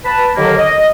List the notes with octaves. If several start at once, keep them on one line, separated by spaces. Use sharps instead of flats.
B4 A5 B5
D#2 D3 D#3 F#3 A#3
D#5